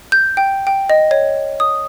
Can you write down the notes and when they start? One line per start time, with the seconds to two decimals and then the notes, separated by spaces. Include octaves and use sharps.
0.12 G6
0.37 G5
0.67 G5
0.90 D#5
1.11 C#5
1.60 D#6